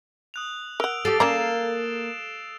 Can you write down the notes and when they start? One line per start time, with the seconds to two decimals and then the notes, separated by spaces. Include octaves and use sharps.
0.34 D#6 F#6 F7
0.80 A#4 F#5 E6 D7 F7
1.05 G4 A4 A6 C7 D7
1.20 A#3 C#4 D5 A#5 E6 E7